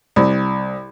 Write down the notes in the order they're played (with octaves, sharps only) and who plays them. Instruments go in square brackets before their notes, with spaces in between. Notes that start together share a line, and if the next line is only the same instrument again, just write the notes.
[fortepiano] C2